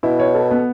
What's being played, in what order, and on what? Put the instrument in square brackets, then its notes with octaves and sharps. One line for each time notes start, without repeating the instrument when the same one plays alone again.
[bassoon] B2 [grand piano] E4
[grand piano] C#5
A4
B3